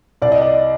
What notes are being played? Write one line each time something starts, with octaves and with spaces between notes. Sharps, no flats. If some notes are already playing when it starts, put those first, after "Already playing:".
C2 D5
D#5
D5